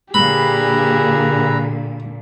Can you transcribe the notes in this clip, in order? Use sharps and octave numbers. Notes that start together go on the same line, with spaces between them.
A#2 D3 G4 G#4 B4 A#5 B5 E6